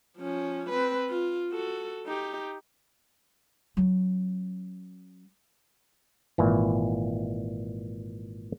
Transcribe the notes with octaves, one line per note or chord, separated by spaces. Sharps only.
F3 C#4
C4 B4
F4
F#4 A4
D#4 G4
F#3 C#4
G#1 A#2 E3